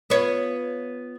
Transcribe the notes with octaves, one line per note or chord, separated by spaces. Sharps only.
B3 F4 C#5